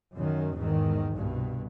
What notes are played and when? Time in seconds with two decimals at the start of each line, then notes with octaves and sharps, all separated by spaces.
0.14 F#2 D#3
0.56 E2 G#2 D#3
1.12 C2 G2 B2